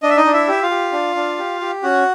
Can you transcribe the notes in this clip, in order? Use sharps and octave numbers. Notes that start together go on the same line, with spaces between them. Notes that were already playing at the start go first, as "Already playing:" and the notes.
D4 D#5
E5
D#4 D#5
D4
E4 E5
G4 E5
F4 F5
G4
D4
D4
G4
G4
C#4 F#4 F#5